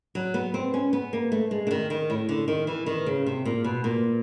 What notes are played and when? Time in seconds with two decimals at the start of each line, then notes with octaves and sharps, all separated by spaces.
0.15 F#3
0.34 B3
0.54 C4
0.74 C#4
0.93 B3
1.13 A#3
1.32 A3
1.51 G#3
1.67 D3
1.71 D#3
1.90 D#3
2.10 A2
2.29 D3
2.48 D#3
2.67 E3
2.86 D#3
3.06 C#3
3.26 C3
3.45 A#2
3.64 B2
3.84 A#2